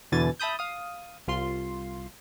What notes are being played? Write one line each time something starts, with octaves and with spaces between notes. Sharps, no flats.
E2 B2 D3 E3 G#5 A6
E5 A5 B5 D#6 G6
F5 D#6
C2 F4 C6